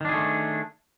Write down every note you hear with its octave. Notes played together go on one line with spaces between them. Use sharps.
D#3 A3 D4 G#4